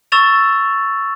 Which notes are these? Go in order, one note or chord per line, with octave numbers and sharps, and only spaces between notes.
C#6 E6 A6 E7 F7